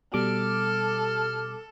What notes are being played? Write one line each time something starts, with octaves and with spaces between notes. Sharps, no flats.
B2 G3 A4 D6 F6